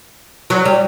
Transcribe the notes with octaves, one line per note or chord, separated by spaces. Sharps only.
F#3
G3